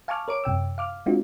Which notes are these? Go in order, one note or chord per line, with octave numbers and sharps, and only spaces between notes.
F5 G#5 A5 C#6 D6 F6
A#4 C#5 D6 D7
F#2 C3 G5 E6
F5 D6 F6
G#3 C4 D4 D#4 F4 F#4